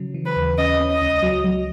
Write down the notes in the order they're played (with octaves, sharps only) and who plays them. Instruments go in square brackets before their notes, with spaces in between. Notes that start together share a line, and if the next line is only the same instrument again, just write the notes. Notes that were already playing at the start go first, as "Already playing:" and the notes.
Already playing: [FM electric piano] C#3 F#3
E3
[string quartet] B4
[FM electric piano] D#2
[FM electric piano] C#4 [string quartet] D#5
[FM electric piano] C#4
[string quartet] D#5
[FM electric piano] C#2
F#3
F#3